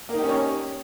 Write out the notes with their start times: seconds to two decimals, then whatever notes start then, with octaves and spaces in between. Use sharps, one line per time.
0.09 A#3
0.14 D#4
0.19 G4
0.23 C#4
0.28 C#5